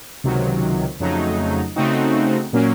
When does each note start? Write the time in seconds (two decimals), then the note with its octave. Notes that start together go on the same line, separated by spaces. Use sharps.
0.24 C#2 C3 D#3 F#3
1.00 F2 C#3 F#3 A3 D#4
1.76 C#3 A3 C4 D#4 F#4
2.53 A#2 F#3 A#3 C#4